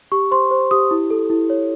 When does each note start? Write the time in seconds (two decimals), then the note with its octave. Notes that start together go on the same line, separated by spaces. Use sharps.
0.12 G4 C#6
0.31 C5 C6
0.51 C5
0.71 G4 D#6
0.91 E4
1.10 A4
1.30 E4
1.50 C#5